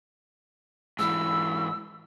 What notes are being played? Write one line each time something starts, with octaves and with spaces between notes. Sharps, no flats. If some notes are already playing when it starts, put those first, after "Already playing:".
G#2 E3 E6